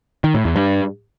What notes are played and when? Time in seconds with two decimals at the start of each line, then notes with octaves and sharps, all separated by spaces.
0.24 D#3
0.34 A2
0.45 E2
0.56 G2